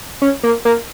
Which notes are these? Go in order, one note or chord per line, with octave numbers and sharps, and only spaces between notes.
C#4
A#3
A#3